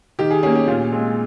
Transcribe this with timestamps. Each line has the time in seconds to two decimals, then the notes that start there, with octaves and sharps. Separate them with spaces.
0.19 D#3 G4
0.30 G#4
0.43 A#3 C#4 G#4
0.55 G4
0.67 A#2 F4
0.92 G#3 C4